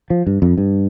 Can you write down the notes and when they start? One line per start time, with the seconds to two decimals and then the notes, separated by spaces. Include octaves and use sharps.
0.10 F3
0.27 G2
0.42 F2
0.58 G2